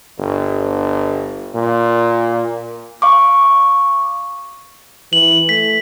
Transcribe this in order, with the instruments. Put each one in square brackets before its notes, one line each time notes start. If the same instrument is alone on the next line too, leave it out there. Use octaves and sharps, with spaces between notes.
[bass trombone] G1
A#2
[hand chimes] F5 C#6 D6
[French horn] E3 [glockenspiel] F#7
[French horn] A3 [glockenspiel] B6